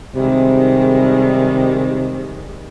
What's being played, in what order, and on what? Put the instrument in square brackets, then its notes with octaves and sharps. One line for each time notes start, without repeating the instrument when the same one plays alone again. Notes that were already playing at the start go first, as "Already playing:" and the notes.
[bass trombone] C3 [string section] D#3 G3 G#3